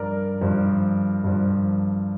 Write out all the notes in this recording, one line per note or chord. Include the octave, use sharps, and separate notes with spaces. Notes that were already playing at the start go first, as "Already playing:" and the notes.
Already playing: G2 F3 A#4 D5
G2 F3
G2 F3